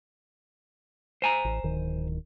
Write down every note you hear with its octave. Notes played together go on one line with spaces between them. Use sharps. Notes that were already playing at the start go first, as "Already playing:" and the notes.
C5 G#5 A#5
A1
D1 D#3